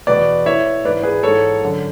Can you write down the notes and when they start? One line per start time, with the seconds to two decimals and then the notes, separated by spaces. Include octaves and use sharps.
0.07 E2 B2 B4 D5
0.46 A2 E3 C#5 E5
0.85 G#2 B4 D5
0.89 E3
1.03 G#4 B4
1.23 G#2 E3 A4 C#5
1.61 F#2 D3